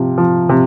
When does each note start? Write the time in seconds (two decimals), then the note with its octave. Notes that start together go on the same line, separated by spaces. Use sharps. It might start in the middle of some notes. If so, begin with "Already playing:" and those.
Already playing: C3 F3
0.18 F3
0.49 C3